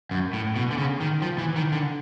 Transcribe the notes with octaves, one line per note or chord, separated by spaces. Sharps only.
F#2
A2
B2
D3
C#3
D#3
F3
E3
D#3
D3